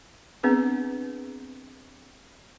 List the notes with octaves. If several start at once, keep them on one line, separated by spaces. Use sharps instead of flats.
B3 C4 D4 G#4 B4